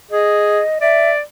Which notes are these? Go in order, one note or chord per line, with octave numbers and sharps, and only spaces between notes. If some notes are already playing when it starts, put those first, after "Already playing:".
G#4 D#5
D5 E5